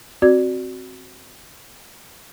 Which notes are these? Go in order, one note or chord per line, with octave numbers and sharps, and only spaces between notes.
C4 F#4 D5 D6 G#6